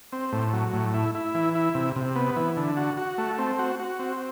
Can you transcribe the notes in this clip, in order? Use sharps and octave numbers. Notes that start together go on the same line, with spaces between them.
C4
A2
F#3
A2
E4
E4
E3
E4
C3
C3
B3
E3
D3
F#4
F#4
A3
C4
F#4
F#4
C4